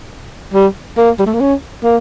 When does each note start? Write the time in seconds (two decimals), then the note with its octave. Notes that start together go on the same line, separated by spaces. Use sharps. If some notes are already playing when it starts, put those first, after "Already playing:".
0.54 G3
0.97 A#3
1.19 G3
1.26 A3
1.34 A#3
1.41 C#4
1.84 A#3